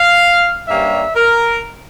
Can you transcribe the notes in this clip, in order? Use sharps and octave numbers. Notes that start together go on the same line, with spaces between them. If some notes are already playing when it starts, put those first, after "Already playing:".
Already playing: F5
G2 G3 A#3 C#4 E5
A#4